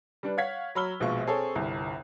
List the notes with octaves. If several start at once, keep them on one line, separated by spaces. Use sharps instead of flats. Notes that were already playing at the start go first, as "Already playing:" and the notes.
G3 D4 B4
C#5 F5 F#5 G#6 B6
F#3 C#5 B5 E6 F6 G7
A#1 B2 G#3 F4 C#6
C4 G#4 A4 C#5
G1 C2